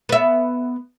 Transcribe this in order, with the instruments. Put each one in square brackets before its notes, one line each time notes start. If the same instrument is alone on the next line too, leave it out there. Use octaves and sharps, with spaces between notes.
[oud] B3 E5